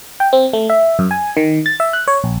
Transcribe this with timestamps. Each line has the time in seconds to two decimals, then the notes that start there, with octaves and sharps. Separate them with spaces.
0.20 G5
0.33 C4
0.53 A3
0.70 E5
0.99 F#2
1.11 G#5
1.37 D#3
1.66 A6
1.80 E5
1.93 F#6
2.08 C#5
2.24 A#1